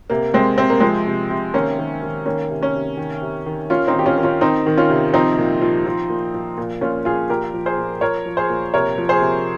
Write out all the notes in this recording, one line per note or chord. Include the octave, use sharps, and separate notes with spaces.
C3 A#3
C3 G#3 C4
C3 C4
A#3
F3 G#3 C4
C3
C3
D#3 A#3 C#4
D#3
D#3
D#3 A#3 C#4
C3
A#3 C#4
C3
D#3
C3
D#3
D#3 C#4 F4
C4 D#4
D#3
G4
C#4 F4
D#3
C#4 F4
D#3 C4 D#4
D#3
C#4 F4
C3
F3 C4 D#4
A#2
F3
F3
A#2
F3
A#2
A#2 C#4 F4
F3 F4 G#4
A#2 G4 A#4
F3
G#4 C5
A#2
F3 A#4 C#5
F3
G#4 C5
A#2
C3 A#4 C#5
F3
G#4 C5
C3